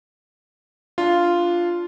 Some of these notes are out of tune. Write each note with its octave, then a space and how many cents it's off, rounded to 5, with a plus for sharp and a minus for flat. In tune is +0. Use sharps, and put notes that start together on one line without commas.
D4 +0 F4 -5